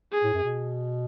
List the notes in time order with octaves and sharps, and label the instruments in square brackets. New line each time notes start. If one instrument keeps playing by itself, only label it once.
[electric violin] G#4
[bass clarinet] A2
F#2
B2